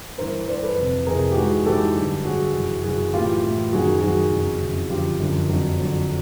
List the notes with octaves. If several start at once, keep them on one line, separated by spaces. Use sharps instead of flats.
G2 E3 A#4 C5
G2 E3 C5 D5
A4 B4
F2 C3 E3
F2 C3 E3 G#4 A#4
G4
G#2 E3 F#4 G#4
G#2 E3 G4 A4
G2 D3 F#3
G2 D3 F#3 F#4 G#4
F#2 C#3 E3
F#2 C#3 E3 F#4 G#4
A2 E3 F4 G4
A2 E3
F#2 D#3 F#3 F#4 G#4
F#2 D#3 F#3 F#4 G#4
F2 C#3 E3
F2 C#3 E3
F#2 D3 F3 F4 G4
F#2 D3 F3
F2 D3 F#3
F2 D3 F#3